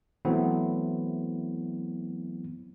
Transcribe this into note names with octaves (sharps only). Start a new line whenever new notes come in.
E3 F#3 A3 B3 C4 E4